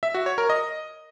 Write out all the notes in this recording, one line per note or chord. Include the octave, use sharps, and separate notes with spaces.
E5
F#4
C#5
A#4
D#5